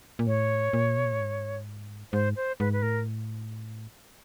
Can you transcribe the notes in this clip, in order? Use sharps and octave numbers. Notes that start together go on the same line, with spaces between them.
A#2
A2 C#5
A#2
B2
A#2
A2
G#2
G#2 C5
C5
G#2 B4
B4
A2 A#4